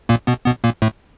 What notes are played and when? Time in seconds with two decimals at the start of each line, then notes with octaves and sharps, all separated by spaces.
0.09 A#2 A#3
0.27 B2 B3
0.45 B2 B3
0.64 A#2 A#3
0.82 A2 A3